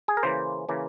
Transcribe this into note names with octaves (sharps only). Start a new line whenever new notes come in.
G#4
A#4
C#3 E3 A#3 C5
C#3 E3 A#3